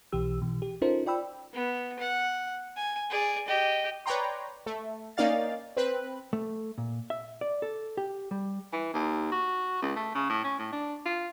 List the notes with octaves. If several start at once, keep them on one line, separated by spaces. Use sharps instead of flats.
B1 B2 E3 G4 E6
B2 E3
G4
C#4 D#4 F4 A4 A#4 C5
F4 D5 G5 B5 E6
B3
F#5
G#5
G#4 D5
G4 D#5
B4 C#5 D5 G5 A#5 C6
A3
A#3 C#4 D#4 D5 F5 A6
C4 B4 F#6
A3
A#2
E5
D5
A4
G4
G3
E3
D#2
F#4
C#2
A3
C#3
A2
C#4
A2
D4
F4